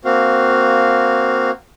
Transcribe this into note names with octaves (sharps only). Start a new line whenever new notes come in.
A#3 C4 F#4 F5